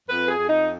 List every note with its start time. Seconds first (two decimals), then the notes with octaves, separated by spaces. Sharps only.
0.09 F2 B4
0.28 G#4
0.38 F2
0.49 D#4